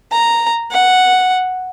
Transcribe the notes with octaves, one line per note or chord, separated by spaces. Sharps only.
A#5
F#5